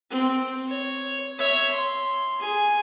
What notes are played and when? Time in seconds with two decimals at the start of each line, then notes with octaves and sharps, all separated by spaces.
0.10 C4
0.68 C#5
1.39 C#5 E5
1.71 C6
2.39 G#4 G#5